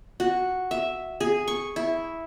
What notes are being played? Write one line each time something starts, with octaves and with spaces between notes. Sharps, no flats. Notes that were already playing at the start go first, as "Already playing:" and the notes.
F#4
E5
G#4
C#6
E4